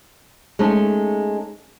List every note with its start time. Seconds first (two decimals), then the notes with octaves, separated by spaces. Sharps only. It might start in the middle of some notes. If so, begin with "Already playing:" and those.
0.59 G#3 A3 C#4 D#4